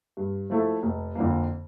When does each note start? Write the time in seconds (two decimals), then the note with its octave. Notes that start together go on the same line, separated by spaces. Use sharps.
0.17 G2
0.50 F3 A3 E4 A4
0.83 F1
1.15 F2 D3 F3 A#3